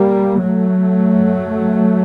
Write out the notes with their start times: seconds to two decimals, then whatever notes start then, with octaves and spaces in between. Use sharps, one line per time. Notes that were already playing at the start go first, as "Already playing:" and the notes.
Already playing: G3 A#3
0.43 F#3 A3
1.13 F#2